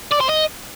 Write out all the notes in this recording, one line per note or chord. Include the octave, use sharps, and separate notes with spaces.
D5
C5
D#5